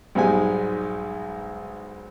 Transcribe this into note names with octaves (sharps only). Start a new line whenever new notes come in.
B1 G#2 G3 G#3 G#5